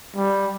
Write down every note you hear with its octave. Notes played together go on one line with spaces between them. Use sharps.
G3